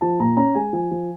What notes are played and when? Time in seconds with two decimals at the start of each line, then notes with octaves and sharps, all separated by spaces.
0.01 F3 A5
0.20 A#2 A#5
0.37 C#4 A#5
0.55 G#3 G#5
0.73 F3 G#5
0.91 F3